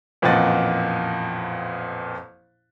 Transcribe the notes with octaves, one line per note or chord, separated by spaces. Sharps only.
A1 F2 A#2 D#5 F#5 A6